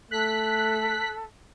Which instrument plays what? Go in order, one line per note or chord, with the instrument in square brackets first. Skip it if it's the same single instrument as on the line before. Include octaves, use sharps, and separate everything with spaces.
[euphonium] A3 [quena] A4 [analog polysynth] F#6 B6